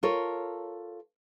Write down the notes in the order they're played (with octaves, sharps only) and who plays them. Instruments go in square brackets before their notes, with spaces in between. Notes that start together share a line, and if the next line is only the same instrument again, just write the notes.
[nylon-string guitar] F4 A4 A#4 C#5